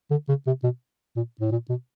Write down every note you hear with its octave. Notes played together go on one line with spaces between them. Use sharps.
D3
C#3
C3
B2
A#2
A2
A#2
B2